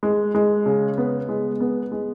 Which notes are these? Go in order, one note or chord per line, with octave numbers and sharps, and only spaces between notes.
G#3
G#3
C#3
B3
G#3
B3
G#3